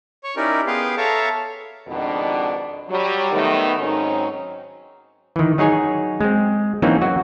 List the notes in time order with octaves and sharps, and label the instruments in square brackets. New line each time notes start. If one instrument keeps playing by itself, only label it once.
[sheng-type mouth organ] C#5 C#6
C#4 D#4 E4 G4 A#4 D5
B3 G#4 B4 F5 G5 C6
A4 C#5 E5 F5 A5 A#5
[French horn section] F2 G#2 B2 D#3 B3 D4
F#3 G3
D#3 A3 B3
G#2 D#3 F#3 C4 C#4 D#4
[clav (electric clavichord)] D#3 E3
F#3 D#4 G#4 C#5 G#5
G#3 C4
E3 F#3 A#3 C4 C#4 D#4
F#3 F#4